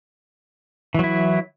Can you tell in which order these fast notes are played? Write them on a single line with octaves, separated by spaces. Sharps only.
E3 F#3 E4